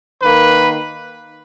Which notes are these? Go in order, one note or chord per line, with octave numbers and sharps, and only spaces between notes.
D#3 A#3 B4